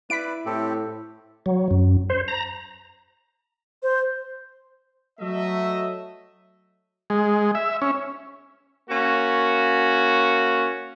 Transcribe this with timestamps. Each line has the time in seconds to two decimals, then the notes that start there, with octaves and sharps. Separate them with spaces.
0.10 E4 B4 D5 B6 D7
0.46 A2 C4 G4 A4
1.46 F#3
1.71 F#2
2.10 C5
2.28 A#5
3.83 C5
5.20 F#3 A3 D#5 E5
7.10 G#3
7.55 E5
7.82 C#4
8.89 A#3 C#4 F#4